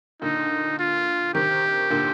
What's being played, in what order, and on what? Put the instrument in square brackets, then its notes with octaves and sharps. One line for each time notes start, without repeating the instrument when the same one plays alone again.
[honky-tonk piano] A#2 D3 [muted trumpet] D#4
[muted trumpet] F4
[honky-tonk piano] C3 D#3 [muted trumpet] G4
[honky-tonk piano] A#2 D3